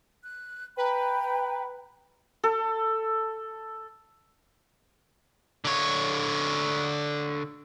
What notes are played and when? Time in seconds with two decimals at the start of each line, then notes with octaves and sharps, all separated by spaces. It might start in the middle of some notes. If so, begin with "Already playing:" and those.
0.24 F#6
0.77 B4 G5 A#5 B5
2.43 A4
5.65 D3 C#5